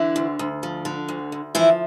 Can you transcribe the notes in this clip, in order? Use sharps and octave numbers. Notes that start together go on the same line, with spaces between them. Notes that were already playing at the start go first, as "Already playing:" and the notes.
Already playing: D3 E3 E4
D2
D2
F3
D3
D2
D2
E3 F3 E4